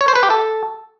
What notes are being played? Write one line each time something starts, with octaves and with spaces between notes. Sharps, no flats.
C#5
C5
B4
G4
A4